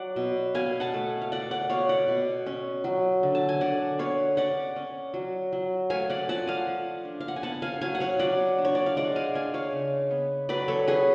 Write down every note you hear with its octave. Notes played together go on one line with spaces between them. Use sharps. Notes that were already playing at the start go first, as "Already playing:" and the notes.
Already playing: F#3 D5 F#5
B2
B2 F5 G#5
F#5 A5
A3
F5
A3 D5 F#5
D5 F#5
B2 C#5 F5
D5 F#5
B2
C#4
F#3
D3
A5
G#5
D3 D5 F#5
B3 C#5 F5
C#4 D5 F#5
C#4
F#3
F#3
A3 F5 G#5
D5 F#5
F3 F#5 A5
F5 G#5
F3
D4
F5
F#5
G#5
B3 F#5 A5
F5 G#5
F#3 F5 G#5
F#5
C#5 F5
F#3 D5 F#5
D4
C#5
D5
F5
G#3 D5 F#5
F5 G#5
D4 F5 G#5
C#5 F5
C#3
B3
F#3 B4 D5
A4 C#5
C#4 G#4 B4